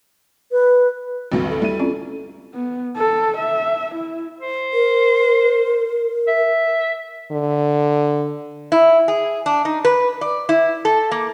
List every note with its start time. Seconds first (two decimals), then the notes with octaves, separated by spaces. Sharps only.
0.52 B4
1.32 A1 D2 G2 C4 F#4
1.50 A4
1.62 G3 E4 D#7
1.79 C4 C#4 F4 D5
2.54 B3
2.97 A4
3.38 E5
3.95 E4
4.40 C5
4.73 A#4
6.28 E5
7.31 D3
8.72 E4
9.08 G#4
9.46 D4
9.65 D#4
9.85 B4
10.21 D5
10.49 E4
10.85 A4
11.11 A#3